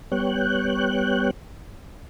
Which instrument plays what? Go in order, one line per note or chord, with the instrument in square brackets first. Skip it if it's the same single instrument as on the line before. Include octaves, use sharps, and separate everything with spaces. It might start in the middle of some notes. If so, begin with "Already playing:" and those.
[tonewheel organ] G3 B3 C#5 G5 F#6